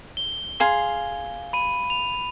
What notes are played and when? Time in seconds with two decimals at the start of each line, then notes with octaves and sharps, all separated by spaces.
0.17 G7
0.60 G#4 F5 C6
1.53 B5 D#7
1.90 F7